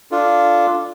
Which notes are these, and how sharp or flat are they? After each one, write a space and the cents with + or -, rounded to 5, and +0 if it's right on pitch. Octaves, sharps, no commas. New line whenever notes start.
D4 +0 F4 +0 A4 +0